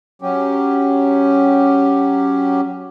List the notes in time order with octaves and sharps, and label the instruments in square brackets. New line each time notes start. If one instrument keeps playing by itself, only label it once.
[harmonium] F#3 C#4 G4